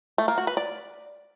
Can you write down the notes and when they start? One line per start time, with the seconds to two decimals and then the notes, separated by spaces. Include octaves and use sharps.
0.18 A3
0.28 A#3
0.38 F#4
0.47 B4
0.57 D5